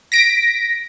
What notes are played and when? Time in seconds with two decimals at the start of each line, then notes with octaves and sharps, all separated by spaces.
0.12 A#6 B6 D7